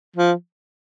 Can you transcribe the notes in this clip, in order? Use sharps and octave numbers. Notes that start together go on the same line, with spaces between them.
F3